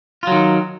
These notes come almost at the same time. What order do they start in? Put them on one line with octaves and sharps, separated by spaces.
F4 F#3 D#3